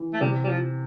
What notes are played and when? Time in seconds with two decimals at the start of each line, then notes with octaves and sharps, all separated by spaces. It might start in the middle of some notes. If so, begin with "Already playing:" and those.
Already playing: E3
0.14 A3
0.21 C3 G3
0.44 G3
0.49 F3